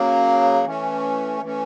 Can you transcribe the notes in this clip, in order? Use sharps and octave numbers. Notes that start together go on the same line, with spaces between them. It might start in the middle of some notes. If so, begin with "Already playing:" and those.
Already playing: C#3 F#3 A#3
E3 A3 C#4
E3 A3 C#4